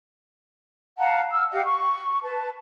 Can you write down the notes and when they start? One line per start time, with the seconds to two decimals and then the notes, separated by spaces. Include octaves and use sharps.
0.99 F5 F#5 A5 A#5
1.31 E6 F6
1.51 G4 D#5 F5 F#5
1.64 C#6
2.23 B4 A5